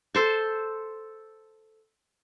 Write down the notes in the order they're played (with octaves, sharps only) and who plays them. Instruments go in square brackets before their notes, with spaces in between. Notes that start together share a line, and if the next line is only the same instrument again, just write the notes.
[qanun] A4 C5 A5